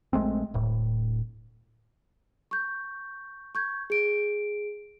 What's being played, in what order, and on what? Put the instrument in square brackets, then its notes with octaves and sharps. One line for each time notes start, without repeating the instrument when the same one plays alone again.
[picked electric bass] A#1 G#3 A3 C4
D1 A2
[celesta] C#6 G6
C#6 G6 G#6
G#4 D7